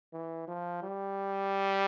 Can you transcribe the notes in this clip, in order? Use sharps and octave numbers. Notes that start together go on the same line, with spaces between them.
E3
F3
G3